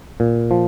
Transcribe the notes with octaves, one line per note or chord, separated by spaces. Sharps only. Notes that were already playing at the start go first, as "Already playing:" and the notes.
A#2
F3